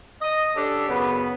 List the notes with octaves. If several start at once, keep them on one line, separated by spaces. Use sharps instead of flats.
D#5
C#4 D4 G4 A4
F#2 C#3 B3